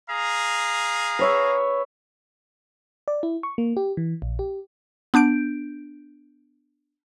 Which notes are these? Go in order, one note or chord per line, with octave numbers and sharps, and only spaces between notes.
G#4 F5 A#5
B4 C#5 E5
D5
E4
C#6
A#3
G4
E3
A#1
G4
B3 D4 G6 D7